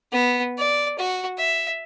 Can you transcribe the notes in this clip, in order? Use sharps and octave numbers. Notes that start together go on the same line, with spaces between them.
B3
D5
F#4
E5